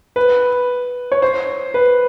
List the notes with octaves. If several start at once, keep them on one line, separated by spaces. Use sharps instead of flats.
B4
C#5
C5
B4